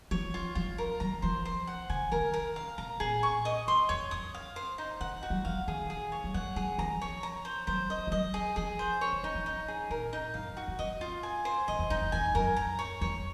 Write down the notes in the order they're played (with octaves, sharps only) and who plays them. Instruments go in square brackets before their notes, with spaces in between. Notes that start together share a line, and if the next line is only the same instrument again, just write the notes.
[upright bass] F3 [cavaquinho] C#5
[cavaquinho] F4
[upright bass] F3 [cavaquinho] F4
[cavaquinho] A#4
[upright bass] F#3 [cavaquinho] A#5
[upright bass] F3 [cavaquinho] C5
[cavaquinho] C5
F#5
[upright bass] C#3 [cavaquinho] G#5
[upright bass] D#3 [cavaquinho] A#4
[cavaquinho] A#4
F5
[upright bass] C3 [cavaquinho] A#5
[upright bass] A#2 [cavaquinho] G#4
[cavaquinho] C#6
D#5
[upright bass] F#2 [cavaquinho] C6
[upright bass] F2 [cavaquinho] C#5
[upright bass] F#2 [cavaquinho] D#6
[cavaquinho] F5
C5
D#4
[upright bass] C#3 [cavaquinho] F#5
[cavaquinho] F#4
[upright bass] F#3
[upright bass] F3 [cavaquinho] F5
[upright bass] D#3 [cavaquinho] G#4
[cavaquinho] G#4
C#5
[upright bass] F#3
[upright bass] F3 [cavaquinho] F#5
[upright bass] F#3 [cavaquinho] G#4
[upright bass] F3 [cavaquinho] A#5
[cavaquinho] C#5
A#5
C5
[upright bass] F#3 [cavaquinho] C5
[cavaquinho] D#5
[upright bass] F3
[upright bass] F#3 [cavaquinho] D#5
[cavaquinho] G#4
[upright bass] F3 [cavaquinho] G#4
[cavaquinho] C5
C#5
[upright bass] D#3
[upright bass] F3 [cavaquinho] D#4
[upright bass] F3
[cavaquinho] D#4
G#4
[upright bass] A#2 [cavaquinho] A#4
[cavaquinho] D#4
[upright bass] F#2 [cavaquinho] F5
[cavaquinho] F#4
[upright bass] F2
[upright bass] F#2 [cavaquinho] D#5
[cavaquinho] F4
G#5
C5
[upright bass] G#2 [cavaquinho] D#5
[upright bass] F2
[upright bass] F2 [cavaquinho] D#4
[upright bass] F2
[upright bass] F2 [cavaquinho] G#5
[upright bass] F#2 [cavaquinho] A#4
[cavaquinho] A#5
C#5
[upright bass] F2 [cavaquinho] C#5